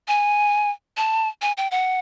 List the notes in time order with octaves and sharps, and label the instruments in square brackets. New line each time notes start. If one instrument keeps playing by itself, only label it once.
[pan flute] G#5
A5
G#5
G5
F#5